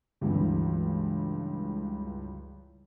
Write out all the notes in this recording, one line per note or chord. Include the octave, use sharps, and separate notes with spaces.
C#2 G2 E3 F#3